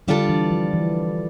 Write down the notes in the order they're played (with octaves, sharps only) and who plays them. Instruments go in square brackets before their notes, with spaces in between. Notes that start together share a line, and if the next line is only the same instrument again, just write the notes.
[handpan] D3 [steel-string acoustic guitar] G3 D4 F4 A4 D5
[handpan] E3
F3
E3